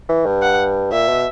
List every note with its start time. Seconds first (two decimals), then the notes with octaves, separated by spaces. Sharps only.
0.09 E3
0.26 G2
0.42 F#5
0.92 A#2 E5
1.09 B2